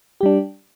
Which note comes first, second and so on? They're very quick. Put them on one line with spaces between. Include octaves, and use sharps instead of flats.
G4 G3 D4